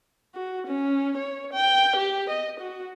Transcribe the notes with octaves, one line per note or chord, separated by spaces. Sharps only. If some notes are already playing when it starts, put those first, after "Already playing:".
F#4
C#4
C#5
G5
G4
D#5
F#4